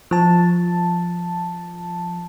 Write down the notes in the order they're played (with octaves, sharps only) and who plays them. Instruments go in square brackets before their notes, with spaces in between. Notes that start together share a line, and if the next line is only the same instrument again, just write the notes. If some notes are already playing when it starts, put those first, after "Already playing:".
[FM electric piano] F3 A5